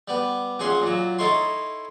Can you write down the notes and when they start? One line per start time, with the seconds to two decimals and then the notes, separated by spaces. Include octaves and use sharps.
0.08 G3 B3
0.59 A#1 C#4 G#4 F#5 C6
0.82 A#2 F#3
1.19 D#4 E4 A4 C#5 C6